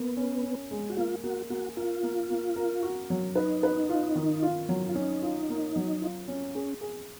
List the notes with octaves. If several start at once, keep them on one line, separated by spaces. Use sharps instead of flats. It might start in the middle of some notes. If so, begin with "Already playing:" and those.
Already playing: A#3 B3
C#4
C#4
G#3
F#4
A#3 F4
A#3 F#4
A#3 F#4
F4 A#4
A#3
A#3
A#4
F#4
F#3
D#4 B4
B4
F4
D#3
F4
F#3
F4
C#4 D#4
F4
A#3
F#3
F4
C#4
C#4 G#4
G#4